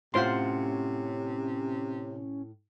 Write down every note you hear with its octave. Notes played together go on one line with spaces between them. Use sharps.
A2 C3 C#4 F4 C5 F#5 C6